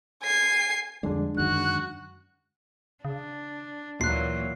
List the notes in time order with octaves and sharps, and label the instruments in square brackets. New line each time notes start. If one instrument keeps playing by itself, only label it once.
[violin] G#5 C7
[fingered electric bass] F2 G3 [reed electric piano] D3 G#3 D4
[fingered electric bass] F#2 D#3 [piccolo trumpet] F#4 [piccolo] F#6
[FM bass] C#3 [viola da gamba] D4
[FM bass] D2 [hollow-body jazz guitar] A#2 [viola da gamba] E3 F#3 A#3 [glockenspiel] F#6 C7